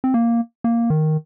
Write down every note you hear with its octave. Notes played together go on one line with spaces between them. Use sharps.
C4
A#3
A#3
D#3